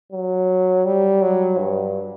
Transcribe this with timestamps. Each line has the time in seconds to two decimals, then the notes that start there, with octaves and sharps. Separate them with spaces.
0.12 F#3
0.85 G3
1.22 F#3
1.59 G2